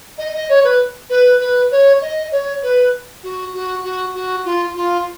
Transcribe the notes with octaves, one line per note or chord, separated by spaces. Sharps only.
D#5
D#5
C#5
B4
B4
B4
C#5
D#5
C#5
B4
F#4
F#4
F#4
F#4
F4
F4